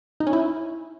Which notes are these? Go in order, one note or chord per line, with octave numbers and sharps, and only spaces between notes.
D#4
C#4
E4